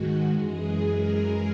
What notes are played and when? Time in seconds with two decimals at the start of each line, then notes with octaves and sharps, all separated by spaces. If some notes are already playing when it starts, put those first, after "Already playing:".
Already playing: G#2 D#3 G#3 F#4
0.28 F#2 E3 G#3 G#4
0.80 A#4